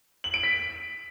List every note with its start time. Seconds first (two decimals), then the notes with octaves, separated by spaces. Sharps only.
0.24 F#7
0.34 D7
0.43 B6